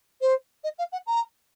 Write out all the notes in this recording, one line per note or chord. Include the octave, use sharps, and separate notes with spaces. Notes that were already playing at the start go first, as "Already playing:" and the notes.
C5
D#5
F5
F#5
A#5